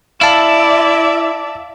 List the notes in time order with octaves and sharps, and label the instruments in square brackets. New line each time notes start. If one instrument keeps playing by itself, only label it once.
[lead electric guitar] E4 [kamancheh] D5 E5 [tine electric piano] F5 A5